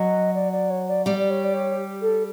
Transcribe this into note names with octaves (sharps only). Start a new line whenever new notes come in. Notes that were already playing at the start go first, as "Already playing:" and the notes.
Already playing: F#3 F#4 D#5
D5
D5
C#5
D5
G3 G4 D5
D5
C#5
D5
C#5
A4